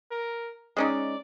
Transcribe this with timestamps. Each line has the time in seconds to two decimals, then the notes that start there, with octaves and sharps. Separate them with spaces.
0.11 A#4
0.77 G#3 C#4 D#4 D5